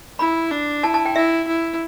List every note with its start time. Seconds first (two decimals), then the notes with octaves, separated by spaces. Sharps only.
0.19 E4 B5
0.51 D4
0.83 E4 A5
0.94 A5
1.05 G5
1.15 E4 E5
1.47 E4